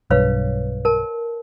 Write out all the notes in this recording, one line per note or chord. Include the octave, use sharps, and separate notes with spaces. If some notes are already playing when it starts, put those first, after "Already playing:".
B1 G2 B4 C#5 F5
A#4 A5